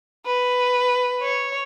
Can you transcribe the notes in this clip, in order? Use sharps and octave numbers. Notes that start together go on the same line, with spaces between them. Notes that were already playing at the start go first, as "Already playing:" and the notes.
B4
C#5